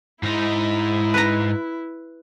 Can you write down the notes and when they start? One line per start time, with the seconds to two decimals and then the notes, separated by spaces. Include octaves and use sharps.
0.23 G#2 D#4 E4
1.14 B4 A#5